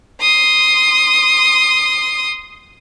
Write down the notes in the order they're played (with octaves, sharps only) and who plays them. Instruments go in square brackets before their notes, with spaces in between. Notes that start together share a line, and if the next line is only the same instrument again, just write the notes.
[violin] C6 D#6